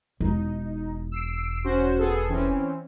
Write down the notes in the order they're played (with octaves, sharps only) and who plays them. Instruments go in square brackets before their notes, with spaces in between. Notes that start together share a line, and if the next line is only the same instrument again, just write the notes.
[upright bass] E1 [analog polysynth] D#4
[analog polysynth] E6 C7 D7
C#4 F#4 C5
B3 G#4 A4
E3 C4 C#4